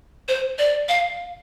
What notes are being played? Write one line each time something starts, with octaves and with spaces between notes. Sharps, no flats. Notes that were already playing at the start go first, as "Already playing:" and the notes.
C5
D5
F5